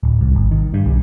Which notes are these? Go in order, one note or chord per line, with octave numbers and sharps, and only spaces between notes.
D1
C2
G#1
D#3
G2
B1